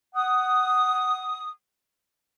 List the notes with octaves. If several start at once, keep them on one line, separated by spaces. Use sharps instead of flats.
F#5 D#6